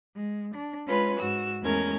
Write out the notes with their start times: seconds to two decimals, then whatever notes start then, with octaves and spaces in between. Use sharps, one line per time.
0.16 G#3
0.55 D4
0.88 G#3 C#4 F4 B4 B5
1.19 G#2 F#4 E6
1.62 E2 G#3 A3 C#4 A#4 G#6